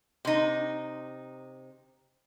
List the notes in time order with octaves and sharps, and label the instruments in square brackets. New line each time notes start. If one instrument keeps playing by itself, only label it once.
[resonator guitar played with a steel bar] C3 D#4